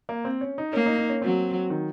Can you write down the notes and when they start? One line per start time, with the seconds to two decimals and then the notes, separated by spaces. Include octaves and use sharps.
0.09 A#3
0.25 C4
0.41 C#4
0.58 D#4
0.73 A#3 C#4
0.86 D#4
0.98 D#4
1.09 C#4
1.22 F#3 C4
1.70 D#3